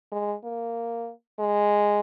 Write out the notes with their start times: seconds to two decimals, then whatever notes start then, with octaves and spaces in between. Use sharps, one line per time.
0.12 G#3
0.44 A#3
1.39 G#3